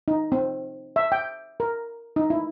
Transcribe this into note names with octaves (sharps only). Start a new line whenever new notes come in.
D#4
C4
E5
G5
A#4
D#4
E4